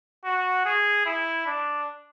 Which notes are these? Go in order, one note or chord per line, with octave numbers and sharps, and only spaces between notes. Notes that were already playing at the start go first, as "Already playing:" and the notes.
F#4
G#4
E4
D4